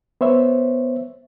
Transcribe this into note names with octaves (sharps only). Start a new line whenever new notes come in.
B3 C5 C#5 E5